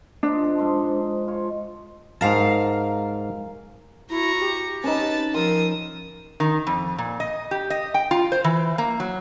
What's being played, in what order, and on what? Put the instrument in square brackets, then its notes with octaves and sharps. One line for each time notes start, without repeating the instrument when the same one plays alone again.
[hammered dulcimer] F3 D#4 [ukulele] D4
[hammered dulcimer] A4
G#2 C6
F4 C#5
[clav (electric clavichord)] G#2 A5 [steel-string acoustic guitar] A#4 F5
[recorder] E4 [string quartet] F#4 A#5 C#6
[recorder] G4
[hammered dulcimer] C#4 D#4 [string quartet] B4 A5 A6
[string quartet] F3 D#6 E6 [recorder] A#4 [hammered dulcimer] C6
[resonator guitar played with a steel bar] D#3
F2
A#2
D#5
G4
D#5
G5
F4
C5
E3
A#3
F#3